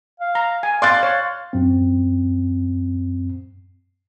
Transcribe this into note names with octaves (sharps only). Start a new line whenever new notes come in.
F5
A#5
G#5
D5 F5 C6 D6 F#6 A6
C#5
F#2 C4